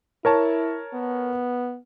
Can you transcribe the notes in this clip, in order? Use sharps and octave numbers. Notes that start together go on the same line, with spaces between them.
E4 A#4 C#5 A5
B3